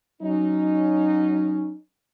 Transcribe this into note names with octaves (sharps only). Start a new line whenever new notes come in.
F#3 C#4 D#4